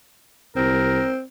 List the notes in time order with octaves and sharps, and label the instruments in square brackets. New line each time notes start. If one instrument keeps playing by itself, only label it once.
[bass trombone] C2 [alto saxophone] C4 [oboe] A#4